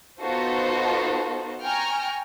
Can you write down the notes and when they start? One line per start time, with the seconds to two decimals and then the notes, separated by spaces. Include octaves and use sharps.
0.20 B3 D#4 F4 F#4 A4 C5
1.62 G5 G#5 A#5 C#6 F6